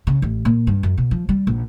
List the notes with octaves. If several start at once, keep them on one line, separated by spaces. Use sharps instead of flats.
C#3
A1
A#2
G2
F#2
B2
F3
G3
A#1